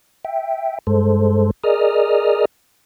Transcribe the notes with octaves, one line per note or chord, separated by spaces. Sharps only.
E5 G5
G2 G#3 A4 C5
G#4 A#4 D5 D#5 D#6 F6